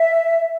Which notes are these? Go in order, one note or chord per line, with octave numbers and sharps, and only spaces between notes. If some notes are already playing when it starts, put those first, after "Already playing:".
Already playing: E5